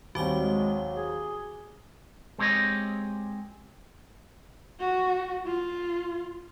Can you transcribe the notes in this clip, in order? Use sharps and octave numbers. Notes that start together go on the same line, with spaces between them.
D#2 F#3 G3 C4 F#4 G#5 D6 G7
G#3
G#4
G#3 C4 G4 C#5 D#5
F#4
F4